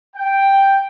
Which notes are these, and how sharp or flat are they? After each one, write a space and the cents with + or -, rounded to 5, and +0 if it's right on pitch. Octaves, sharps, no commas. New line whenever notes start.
G5 +0